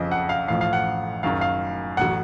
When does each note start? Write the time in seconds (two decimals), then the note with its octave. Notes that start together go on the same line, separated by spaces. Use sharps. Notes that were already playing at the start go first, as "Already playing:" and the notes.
Already playing: F#1 F2 C#3 F3 D#5
0.11 F#5
0.29 F5
0.48 A1 A2 F3 F5
0.61 F5
0.73 F#5
1.23 F#1 F#2 D#3 F5
1.41 F5
1.97 A1 A2 F#3 F#5